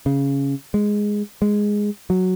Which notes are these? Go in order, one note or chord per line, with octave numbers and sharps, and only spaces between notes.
C#3
G#3
G#3
F#3